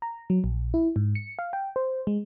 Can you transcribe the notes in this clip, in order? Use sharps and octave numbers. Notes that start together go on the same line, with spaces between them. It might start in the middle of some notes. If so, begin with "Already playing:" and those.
A#5
F#3
A#1
E4
G#2
C#7
F5
G5
C5
G#3